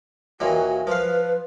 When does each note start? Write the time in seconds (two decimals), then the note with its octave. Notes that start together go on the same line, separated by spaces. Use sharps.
0.40 D#2 A#2 E3 F#4
0.87 F3 B4 F5